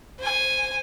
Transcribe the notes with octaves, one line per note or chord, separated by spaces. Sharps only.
C5 G#5